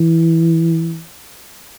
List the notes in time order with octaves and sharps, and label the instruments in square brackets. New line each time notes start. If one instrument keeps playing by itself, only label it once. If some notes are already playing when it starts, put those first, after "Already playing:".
Already playing: [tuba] E3